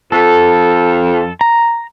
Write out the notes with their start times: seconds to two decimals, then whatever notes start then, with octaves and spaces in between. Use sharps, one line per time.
0.12 F2 A4
1.41 A#5